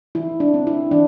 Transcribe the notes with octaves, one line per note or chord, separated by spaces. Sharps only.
E3 E4
D4
C4
E4
E3 D4